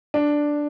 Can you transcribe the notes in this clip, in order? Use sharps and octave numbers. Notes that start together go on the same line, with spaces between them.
D4